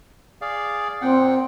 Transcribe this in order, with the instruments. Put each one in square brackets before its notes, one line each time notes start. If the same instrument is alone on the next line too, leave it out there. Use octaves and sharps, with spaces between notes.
[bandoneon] G#4 D5 F5
[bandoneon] A#2 F#5 G5 [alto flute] C4